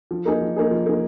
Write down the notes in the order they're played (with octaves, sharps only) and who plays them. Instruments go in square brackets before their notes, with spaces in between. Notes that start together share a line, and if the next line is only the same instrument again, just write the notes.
[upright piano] F3
A#3 D#4 G#4
F3
A#3 D#4 G#4
F3
A#3 D#4 G#4